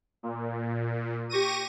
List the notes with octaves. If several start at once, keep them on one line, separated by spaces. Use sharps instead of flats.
A#2
G4 C#6 A#6 D#7